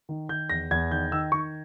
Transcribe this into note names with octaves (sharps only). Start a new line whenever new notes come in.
D#3
D#3 G6
E2 A#6
E2 G#6
D#3 G6
D#3 E6
D#3 C#6